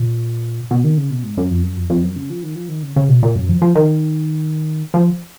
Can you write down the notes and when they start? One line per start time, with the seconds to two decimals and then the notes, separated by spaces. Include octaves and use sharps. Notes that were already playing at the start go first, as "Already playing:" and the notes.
Already playing: A#2
0.71 B2
0.84 D#3
0.98 C#3
1.11 B2
1.24 G#2
1.37 F#2
1.50 F2
1.63 F#2
1.77 F2
1.90 F2
2.02 F#2
2.16 C#3
2.30 F3
2.43 D#3
2.55 F3
2.69 D#3
2.83 C#3
2.96 C#3
3.09 B2
3.23 A#2
3.35 F#2
3.49 F3
3.62 F3
3.75 D#3
4.94 F3